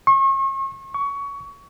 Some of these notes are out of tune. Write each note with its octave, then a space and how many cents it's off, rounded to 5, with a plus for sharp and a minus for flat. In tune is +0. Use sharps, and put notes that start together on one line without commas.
C#6 -40
C#6 +20